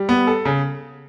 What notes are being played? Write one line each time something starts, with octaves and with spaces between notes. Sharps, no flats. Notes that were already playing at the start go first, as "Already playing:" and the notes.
Already playing: G3
B3
A4
C#3